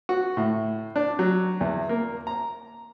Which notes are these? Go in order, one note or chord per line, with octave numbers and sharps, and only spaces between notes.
F#4
A2
D4
F#3
E2
A#3
A#5